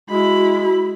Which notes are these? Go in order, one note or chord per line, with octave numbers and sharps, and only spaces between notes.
G#3 E4 F#4 B5